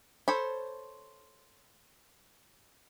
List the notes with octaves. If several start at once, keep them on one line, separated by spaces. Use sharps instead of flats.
A4 C5 C#5 B5